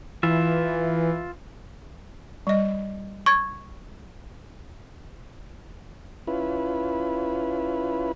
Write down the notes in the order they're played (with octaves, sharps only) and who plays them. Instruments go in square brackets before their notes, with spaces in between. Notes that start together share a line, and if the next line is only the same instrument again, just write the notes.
[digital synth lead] E3 [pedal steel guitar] F4 E5
[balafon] G3 D#5
[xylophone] C#6 G#6 A6
[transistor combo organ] C#4 E4 F4 B4